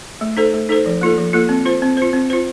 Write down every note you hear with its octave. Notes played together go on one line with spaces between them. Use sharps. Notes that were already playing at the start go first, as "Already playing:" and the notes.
A3
D#4 A4 C5
A3
D#4 A4 C5
F3
A#3 F4 A4
F3
A#3 F4 A4
C4
F4 C5
C4
F4 C5
C4
F4 C5